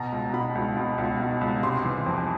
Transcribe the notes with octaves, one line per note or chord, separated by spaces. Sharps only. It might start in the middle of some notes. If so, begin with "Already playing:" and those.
Already playing: B2 A#5
C#2
B2 B5
C#2
B2
C#2
B2
C#2
C3 C6
E3
F2